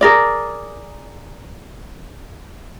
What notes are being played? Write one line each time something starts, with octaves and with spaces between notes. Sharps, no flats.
G#4 A#4 D5